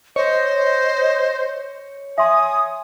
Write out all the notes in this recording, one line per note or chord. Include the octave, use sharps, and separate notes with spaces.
C5 C#5 D#5
E5 G#5 C6 D#6